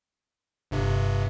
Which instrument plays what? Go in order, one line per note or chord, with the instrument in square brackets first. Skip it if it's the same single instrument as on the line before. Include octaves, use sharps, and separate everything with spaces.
[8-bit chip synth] G1 G2 C3